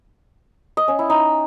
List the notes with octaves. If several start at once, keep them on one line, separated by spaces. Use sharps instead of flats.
D#5
C#4
E4
D#4